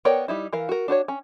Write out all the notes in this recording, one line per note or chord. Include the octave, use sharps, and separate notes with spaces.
B3 A#4 C#5 D5 G5
G3 D#4 E4
E3 A#4 F5
F#4 A#4
D4 F#4 C5 C#5
C#4